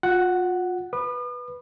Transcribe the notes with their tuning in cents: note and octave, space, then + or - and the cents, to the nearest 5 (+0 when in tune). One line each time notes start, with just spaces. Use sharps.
F4 +35 F#5 +5
B4 -5 D#6 -45